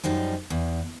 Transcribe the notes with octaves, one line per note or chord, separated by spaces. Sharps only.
F#2 F3 G3 D#4
E2